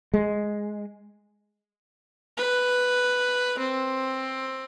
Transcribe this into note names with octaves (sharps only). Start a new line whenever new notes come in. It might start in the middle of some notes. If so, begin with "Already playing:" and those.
G#3
B4
C4